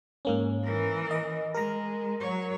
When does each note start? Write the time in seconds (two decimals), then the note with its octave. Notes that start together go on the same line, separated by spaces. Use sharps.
0.25 G#2 A#3 C#4
0.63 E3 A#4
1.11 D#5
1.54 G#3 A#4 A#5
2.20 F#3 C#5